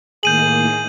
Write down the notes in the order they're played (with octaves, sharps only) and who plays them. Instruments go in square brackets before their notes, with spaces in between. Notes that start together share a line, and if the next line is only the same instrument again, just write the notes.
[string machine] A2 D#3 A#3 [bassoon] G#4 [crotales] G6 D#7 F#7